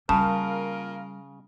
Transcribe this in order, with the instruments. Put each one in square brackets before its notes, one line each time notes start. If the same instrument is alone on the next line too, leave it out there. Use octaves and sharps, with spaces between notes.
[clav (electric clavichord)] C#3 [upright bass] G3 [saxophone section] A#3 F4 A#4 [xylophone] A5